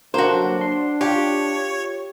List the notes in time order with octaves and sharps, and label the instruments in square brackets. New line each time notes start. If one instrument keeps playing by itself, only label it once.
[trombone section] C2 D3 D4 [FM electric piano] F#3 A#3 [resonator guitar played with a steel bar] F#4 C5
[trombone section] D4 [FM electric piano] C6
[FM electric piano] F4 [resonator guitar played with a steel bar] G4 [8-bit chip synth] C#5